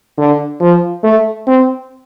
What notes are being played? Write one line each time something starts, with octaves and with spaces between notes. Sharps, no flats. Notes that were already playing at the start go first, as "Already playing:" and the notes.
D3
F3
A3
C4